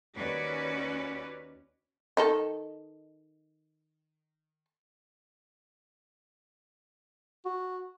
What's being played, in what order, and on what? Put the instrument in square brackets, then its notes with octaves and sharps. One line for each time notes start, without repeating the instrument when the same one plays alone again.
[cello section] D#2 C#4 F#4 B4 D5
[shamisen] D#3 D#4 A4
[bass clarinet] F#4